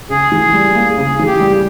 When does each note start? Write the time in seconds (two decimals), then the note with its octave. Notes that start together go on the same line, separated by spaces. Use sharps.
0.10 C#3 G#4
0.32 E3
0.53 G3
0.75 A#3
0.97 C#3 G#4
1.19 E3
1.26 G4
1.40 G3